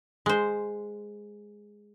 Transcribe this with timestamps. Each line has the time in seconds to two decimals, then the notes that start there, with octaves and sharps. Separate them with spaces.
0.26 G#3 C5